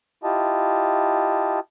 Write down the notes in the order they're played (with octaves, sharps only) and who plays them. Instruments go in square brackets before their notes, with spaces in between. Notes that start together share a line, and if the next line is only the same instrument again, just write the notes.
[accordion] E4 F4 G4 D#5 A5